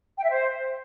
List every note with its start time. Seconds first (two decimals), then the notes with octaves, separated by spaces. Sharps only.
0.18 G5
0.24 E5
0.30 C5